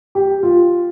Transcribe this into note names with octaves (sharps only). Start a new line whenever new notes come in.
G4
F4